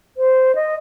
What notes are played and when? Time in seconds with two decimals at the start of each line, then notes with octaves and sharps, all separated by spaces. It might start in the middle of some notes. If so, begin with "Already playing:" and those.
0.17 C5
0.55 D#5